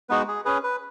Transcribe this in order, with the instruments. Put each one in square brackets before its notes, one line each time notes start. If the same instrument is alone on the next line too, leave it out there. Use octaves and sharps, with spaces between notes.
[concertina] G#3 B3 D#4 F#4 B4
G#4
C#4 G#4 B4
B4